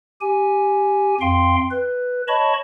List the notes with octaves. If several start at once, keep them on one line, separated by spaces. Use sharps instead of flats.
G4 G#5
F2 F5 G5 C6
B4
C#5 D#5 A5 B5 C#6